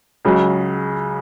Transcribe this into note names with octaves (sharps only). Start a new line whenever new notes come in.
C#2 C#3 F#3